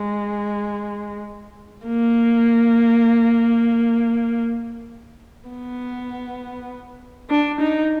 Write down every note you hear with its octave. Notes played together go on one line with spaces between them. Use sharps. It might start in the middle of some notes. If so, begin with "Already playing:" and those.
Already playing: G#3
A#3
B3
D4
D#4